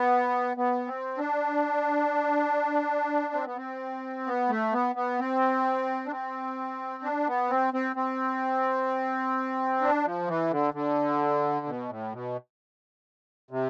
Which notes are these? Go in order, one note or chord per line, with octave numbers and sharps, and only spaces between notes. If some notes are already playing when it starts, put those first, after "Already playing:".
Already playing: B3
B3
C4
D4
C4
B3
C4
B3
A3
B3
B3
C4
D4
C4
D4
B3
C4
C4
C4
D4
F3
E3
D3
D3
B2
A2
B2
C3